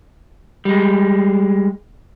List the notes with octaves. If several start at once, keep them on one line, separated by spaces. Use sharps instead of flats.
G3 G#3